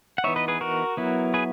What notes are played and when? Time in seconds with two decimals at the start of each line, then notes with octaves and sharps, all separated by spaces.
0.18 F#5
0.24 E3 B3 D#4 C#5 E5
0.36 B4 D#5
0.48 G#4 B4
0.61 F#4 A#4
0.97 F#3 B3 E4
1.34 G#4 B4